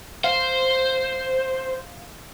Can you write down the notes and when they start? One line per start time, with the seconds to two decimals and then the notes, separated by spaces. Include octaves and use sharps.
0.24 C5 F5